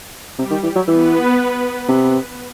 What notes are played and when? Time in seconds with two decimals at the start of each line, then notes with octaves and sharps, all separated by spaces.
0.38 C3 G3 G4
0.51 D#3
0.63 E3
0.76 F#3
0.88 E3 B3 B4
1.89 C3